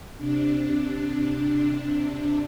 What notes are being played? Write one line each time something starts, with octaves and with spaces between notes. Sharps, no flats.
C3 D4